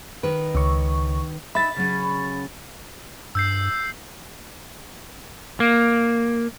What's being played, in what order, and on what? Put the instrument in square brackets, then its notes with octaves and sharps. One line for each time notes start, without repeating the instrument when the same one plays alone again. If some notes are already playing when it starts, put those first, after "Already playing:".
[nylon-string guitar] D#3 B4
[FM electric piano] C#2 C#6
[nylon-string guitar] D#4 E5 [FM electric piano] B5 A6
[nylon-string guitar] C#3 F#3 C#4
[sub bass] G2 [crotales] E6 G6 C7
[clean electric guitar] A#3